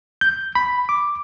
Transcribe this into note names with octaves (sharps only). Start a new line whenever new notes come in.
G6
B5
D6